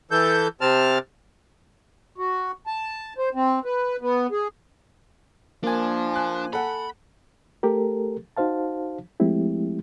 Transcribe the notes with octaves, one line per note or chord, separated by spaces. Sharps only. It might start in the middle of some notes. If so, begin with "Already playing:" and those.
E3 A4 G6
C3 C4 A5 F6
F#4
A5
C5
C4
B4
B3
G#4
F3 A#3 D4 G#5
F#6
A4 F#5 B5
A3 G4 A4 A#4
D#4 F#4 C5 F5 A5
F3 G#3 A3 C4 E4 G4